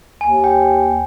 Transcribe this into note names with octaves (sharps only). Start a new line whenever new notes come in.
D#2 G#5
G5